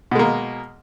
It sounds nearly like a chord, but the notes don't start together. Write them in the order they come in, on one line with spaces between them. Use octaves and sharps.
B2 G#3 A#3